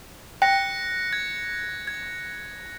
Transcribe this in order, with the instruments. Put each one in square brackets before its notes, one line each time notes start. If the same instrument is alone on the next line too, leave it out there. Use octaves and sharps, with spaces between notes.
[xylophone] G5 [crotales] F#6 A#6 C#7
[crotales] G#6
G#6